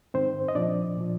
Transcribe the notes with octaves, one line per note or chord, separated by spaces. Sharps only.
G#2 D#3 C4 C5
D#5
A#2 F3 D4 D5
A#2 F3